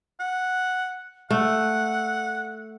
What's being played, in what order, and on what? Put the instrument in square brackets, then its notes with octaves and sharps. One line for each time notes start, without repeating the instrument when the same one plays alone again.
[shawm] F#5
[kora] A3 [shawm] F#5